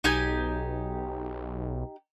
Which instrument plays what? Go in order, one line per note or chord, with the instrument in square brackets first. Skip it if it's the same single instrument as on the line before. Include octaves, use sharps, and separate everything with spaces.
[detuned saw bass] B1 [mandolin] D#4 G4 G#5